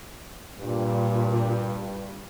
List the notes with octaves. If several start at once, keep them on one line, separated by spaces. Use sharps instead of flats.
G2 A#2